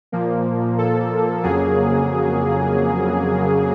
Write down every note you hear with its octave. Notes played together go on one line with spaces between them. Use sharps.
A#2 F3 A#3
A4
F2 C#3 F#3 A#3 G#4